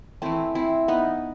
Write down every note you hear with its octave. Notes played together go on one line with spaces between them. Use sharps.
E3 A3 C4 E4
C4 E4
B3 D#4